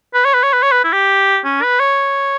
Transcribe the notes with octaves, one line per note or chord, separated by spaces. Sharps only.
B4
C#5
B4
C#5
B4
C#5
B4
E4
G4
C#4
B4
C#5